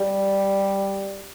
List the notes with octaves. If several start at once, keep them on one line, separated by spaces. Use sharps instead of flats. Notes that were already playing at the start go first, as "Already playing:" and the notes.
Already playing: G3